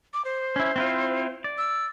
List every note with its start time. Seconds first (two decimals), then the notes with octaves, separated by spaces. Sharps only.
0.14 D6
0.25 C5
0.56 C#4 E4
0.76 C4 E4 F4
1.44 D5
1.58 E6